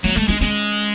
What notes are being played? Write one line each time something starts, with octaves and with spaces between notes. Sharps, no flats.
F#3 A3
G#3 A3
G#3 D4
G#3 C#4